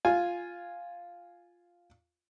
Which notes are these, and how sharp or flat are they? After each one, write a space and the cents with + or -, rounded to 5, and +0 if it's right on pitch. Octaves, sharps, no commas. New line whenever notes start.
F4 +0 G#5 +0